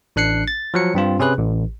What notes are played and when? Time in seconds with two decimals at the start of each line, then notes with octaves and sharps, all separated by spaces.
0.16 A1 D4 F#6 C7 C#7
0.48 A6
0.74 F3 F#3 C#7
0.95 G2 C4 F4
1.19 C3 C#4 G#4 B4 F#6
1.39 A1